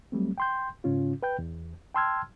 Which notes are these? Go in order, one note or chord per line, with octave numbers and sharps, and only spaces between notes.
F#3 G3 A3 C4
G5 C6 G6
G#2 C#3 C#4 F4
B4 G5 G6
E2
G5 A5 C6 E6 F6 G#6